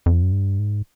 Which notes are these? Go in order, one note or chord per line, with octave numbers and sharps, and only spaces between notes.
F2
F#2
G2
G#2